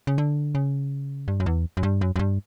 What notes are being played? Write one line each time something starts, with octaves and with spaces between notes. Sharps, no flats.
C#3
D3
C#3
G2
F#2
E2
F#2
G2
F#2
F#2
G2